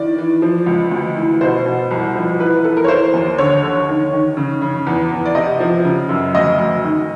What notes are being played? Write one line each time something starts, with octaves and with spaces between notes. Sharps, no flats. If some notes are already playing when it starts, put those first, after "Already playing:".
Already playing: D#3 E3 D5
E3
F3
C#2
D2
E3
B2 C5
B2
C2
F3
E3 B4
E3 A4
A#4
C#5
E3 C5
D#2
D3 C#5
D3
D#3
D#3
C#3
C#3
E2
E2
D5
C3 D#5
F3
C#3
F#2
D2 D#5
D2
D#3